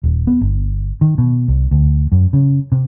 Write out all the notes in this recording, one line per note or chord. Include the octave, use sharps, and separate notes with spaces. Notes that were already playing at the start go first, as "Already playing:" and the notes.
D#1
B3
G1
D#3
B2
C2
D2
F#2
C#3
C3